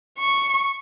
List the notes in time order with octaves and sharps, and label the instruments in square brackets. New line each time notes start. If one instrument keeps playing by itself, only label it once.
[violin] C#6